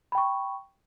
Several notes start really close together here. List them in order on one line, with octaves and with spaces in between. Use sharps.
B5 G5 C#6